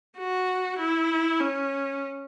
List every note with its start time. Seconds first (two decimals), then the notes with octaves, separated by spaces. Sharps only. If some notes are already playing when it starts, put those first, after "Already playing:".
0.18 F#4
0.79 E4
1.40 C#4